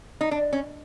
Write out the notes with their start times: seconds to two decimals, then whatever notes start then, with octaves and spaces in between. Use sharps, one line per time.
0.21 D#4
0.31 D4
0.53 C#4